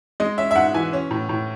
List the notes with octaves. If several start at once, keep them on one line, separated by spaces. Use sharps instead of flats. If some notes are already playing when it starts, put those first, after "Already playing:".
G#3 D#5
C#4 E5
E5
G#2 F#5
E3 G#5
C#4
A2
A2